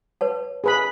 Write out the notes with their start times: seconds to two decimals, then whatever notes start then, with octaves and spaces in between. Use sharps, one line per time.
0.21 B4 C#5 A5
0.64 G#4 B4 B5